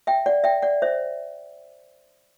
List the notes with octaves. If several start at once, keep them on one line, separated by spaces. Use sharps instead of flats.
E5 G5
D5 F#5
E5 G5
D5 F#5
C5 E5